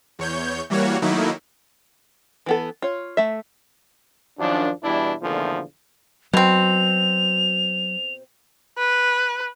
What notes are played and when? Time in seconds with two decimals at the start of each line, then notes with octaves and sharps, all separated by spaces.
0.19 E2 C#5 G6
0.70 E3 G3 A#3 F#4 C#5
1.02 D#3 F#3 A3 A#3 D#4 E4
2.46 E3 B3 A4
2.82 F4 C#5
3.17 A3 E5
4.39 F#2 D#3 F3 D4
4.83 B2 E3 G3 D4 E4
5.22 E2 A#2 D3 D#3 F3 A3
6.33 B2 F#3 C4 F7
8.78 B4